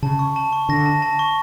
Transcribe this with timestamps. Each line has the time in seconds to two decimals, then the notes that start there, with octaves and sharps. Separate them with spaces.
0.02 C#3 A5
0.19 C#6
0.36 A5
0.52 C#6
0.69 D3 A#6
0.86 A5
1.02 A5
1.19 C#6